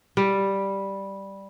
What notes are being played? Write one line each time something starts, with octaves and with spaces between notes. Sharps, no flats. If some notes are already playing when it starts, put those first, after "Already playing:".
G3